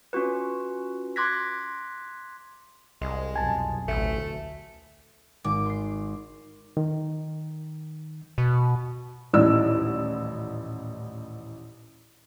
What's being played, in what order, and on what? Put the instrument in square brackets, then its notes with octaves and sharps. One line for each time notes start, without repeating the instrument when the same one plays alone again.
[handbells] C#4 F4 F#4 B4
C6 D6 F#6 G#6 A#6 B6
[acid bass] C2 [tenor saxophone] G#3
[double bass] B1 F2 [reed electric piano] G#5 A5
[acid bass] A1 [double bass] D2 [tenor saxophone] A3
[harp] G#1 [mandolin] D6
[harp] C6 C7
[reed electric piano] D#3
[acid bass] B2
[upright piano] D#1 A1 D#4 E4 D5 E6